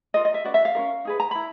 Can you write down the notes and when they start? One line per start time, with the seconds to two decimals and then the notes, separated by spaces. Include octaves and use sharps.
0.14 F4 A#4 D#5
0.25 D#5
0.34 E5
0.44 C#4 F#4 B4 D5
0.54 E5
0.65 F5
0.75 C#4 F4 A#4
1.05 D#4 G#4 B4
1.20 A#5
1.31 E4 B5